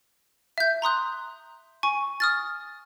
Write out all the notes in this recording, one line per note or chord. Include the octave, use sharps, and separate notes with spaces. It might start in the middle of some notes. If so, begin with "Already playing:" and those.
E5 G6
A#5 C6 D#6 F#6
G#5 C#6
D#6 F6 A6